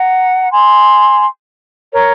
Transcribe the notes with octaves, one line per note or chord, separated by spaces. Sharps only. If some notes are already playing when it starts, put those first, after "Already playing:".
Already playing: F#5 A#5
G#5 C6
A#4 C#5